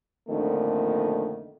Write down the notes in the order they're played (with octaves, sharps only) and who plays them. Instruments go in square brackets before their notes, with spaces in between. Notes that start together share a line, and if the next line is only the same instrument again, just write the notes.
[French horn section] F2 A#2 D3 D#3 A3